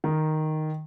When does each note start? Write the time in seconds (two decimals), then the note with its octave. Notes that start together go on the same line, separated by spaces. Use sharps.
0.04 D#3